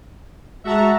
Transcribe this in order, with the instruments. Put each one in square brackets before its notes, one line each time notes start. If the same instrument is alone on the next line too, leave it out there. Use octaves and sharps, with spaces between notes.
[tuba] G#3 [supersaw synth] F#4 A5 A#5 [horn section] E5 F#5